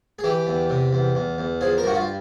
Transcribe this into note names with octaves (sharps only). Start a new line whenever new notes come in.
G#4
E3 G4
E2
C3
E2
E2
E2
F3 G#4
A#4
G2 F#4
F4